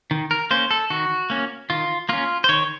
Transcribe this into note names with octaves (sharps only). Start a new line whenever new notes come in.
D#3
A#4
A#3 C#4 C5
A4
D#3 F#4
A#3 C#4
D#3 F4
A#3 C#4 F4
C5
D#3 C#5